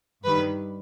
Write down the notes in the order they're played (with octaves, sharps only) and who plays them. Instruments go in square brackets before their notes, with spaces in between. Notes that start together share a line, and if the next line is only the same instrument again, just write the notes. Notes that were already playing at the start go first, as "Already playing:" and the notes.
[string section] G2 D#3 G3 B4